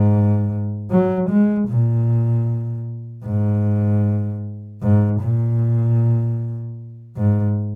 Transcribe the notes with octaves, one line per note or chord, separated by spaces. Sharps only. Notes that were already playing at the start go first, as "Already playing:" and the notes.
Already playing: G#2
F#3
G#3
A#2
G#2
G#2
A#2
G#2